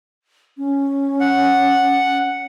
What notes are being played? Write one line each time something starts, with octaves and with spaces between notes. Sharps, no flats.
C#4
F#5